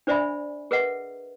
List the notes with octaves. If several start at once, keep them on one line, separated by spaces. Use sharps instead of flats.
D4 C5 D5 E5 G#5 B5
G#4 A#4 B4 D#5 E5 F#5